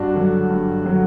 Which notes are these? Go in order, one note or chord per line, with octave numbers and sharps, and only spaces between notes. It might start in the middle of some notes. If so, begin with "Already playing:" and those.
Already playing: G2 D4 F#4
D3 F#3
G2
D3 F#3